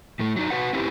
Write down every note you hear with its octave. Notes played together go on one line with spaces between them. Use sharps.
A2 A3
F#3 D#4 D5
F#4 B4 C#5 F#5
C4 C#4 E4 G4 B4 C5